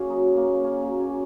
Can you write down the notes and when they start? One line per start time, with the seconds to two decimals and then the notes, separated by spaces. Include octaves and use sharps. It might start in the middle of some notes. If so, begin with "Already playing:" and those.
Already playing: F#2 A#3 C#4 F#4 G#4
0.10 F#3 D#4
0.28 F#2
0.37 A#3
0.45 C#3
0.63 A#3 C#4
0.81 F#3 A#3
0.99 F#2 C#4
1.10 C#4